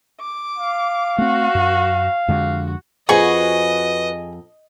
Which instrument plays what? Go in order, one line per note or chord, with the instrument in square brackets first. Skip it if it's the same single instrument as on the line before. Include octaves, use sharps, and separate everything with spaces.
[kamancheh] D6
[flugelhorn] F5
[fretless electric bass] A3 C4 [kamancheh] F#4
[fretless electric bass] F#2
[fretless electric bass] F2 D3 G#3 [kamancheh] F#4
[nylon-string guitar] F2 C5 [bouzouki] F#4 B4 [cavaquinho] G#4 C#6 [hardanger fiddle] D#5